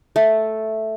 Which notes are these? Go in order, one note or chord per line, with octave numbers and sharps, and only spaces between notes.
A3